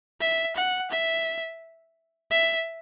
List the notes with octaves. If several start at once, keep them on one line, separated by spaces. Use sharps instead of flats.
E5
F#5
E5
E5